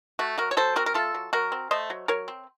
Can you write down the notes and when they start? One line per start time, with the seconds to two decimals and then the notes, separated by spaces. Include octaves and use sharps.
0.19 A3 F#4
0.38 F#3 F#4 A#4
0.51 C#5
0.57 F#3 A4 C5
0.76 C4 F#4 A#4
0.86 A#4
0.94 A3 F4 A4
1.15 F#3
1.33 F#3 F#4 A#4
1.52 C4
1.71 A3 C5 D#5
1.90 F#3
2.08 F#3 A#4 C#5
2.28 C4